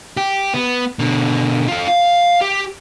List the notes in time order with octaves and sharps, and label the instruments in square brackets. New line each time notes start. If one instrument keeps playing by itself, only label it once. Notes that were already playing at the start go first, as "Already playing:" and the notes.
[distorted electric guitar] G4
B3
B2 D3
F4 A4
F5
G4